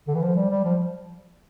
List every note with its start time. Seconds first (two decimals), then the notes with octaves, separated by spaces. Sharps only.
0.08 D3
0.15 E3
0.22 F3
0.36 G3
0.51 G3
0.65 F3